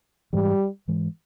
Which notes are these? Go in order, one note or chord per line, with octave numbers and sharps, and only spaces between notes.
G#2 E3 G3 G#3
G#2 E3 G#3